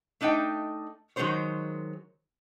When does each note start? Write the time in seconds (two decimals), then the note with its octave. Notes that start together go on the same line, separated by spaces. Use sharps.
0.21 A3 D4 D#4 D#5 G5
1.16 D#3 F#3 G#3 B3 C5 C#5